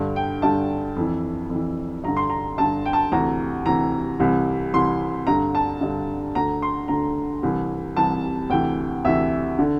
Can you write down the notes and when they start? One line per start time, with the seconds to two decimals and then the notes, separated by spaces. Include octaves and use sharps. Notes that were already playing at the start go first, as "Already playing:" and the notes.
Already playing: G2 D3
0.16 G5
0.42 G2 D3 A5
0.96 F2 E3
1.50 F2 E3
2.04 G2 D3 A#5
2.17 C6
2.30 A#5
2.58 G2 D3 A5
2.86 G5
2.93 A5
3.11 D2 C3 E3 A#5
3.66 D2 C3 E3 A#5
4.19 C2 C3 E3
4.74 C2 C3 E3 C6
5.27 G2 D3 A#5
5.55 A5
5.81 G2 D3
6.35 D2 D3 A#5
6.62 C6
6.88 D2 D3 A#5
7.43 C2 C3 E3
7.96 C2 C3 E3 A5
8.50 D2 C3 E3 G5
9.05 D2 C3 E3 E5
9.59 D3